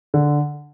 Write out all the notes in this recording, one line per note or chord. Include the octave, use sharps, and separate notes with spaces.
D3